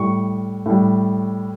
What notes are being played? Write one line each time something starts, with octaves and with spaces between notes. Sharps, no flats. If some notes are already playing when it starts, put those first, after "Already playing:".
Already playing: A2 G3 C#6
A2 G3